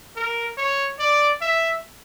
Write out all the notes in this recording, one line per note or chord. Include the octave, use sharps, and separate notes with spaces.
A#4
C#5
D5
E5